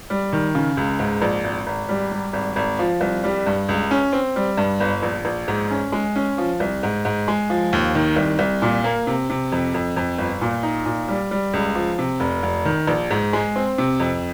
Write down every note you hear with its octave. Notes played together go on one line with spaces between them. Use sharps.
G3
D#3
C#3
C#2
G#2
A#1
G#1
G#1
G3
G3
G#1
G#1
F3
C2
G3
G2
C#2
C#4
C4
G3
G2
G1
A#1
A#1
G#2
C#4
G#3
C#4
F3
C2
G#2
G#2
G#3
F3
D#2
D#3
C2
C2
A#2
A#3
C3
C3
F2
F2
F2
G1
A#2
D#4
A#2
G3
G3
C#2
F3
C3
F1
F1
D#3
A#1
G#2
G#3
C4
C3
F2